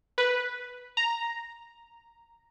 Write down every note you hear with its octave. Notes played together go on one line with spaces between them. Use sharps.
B4
A#5